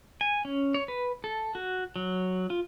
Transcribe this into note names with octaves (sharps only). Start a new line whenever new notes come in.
G#5
C#4
C#5
B4
A4
F#4
F#3
F4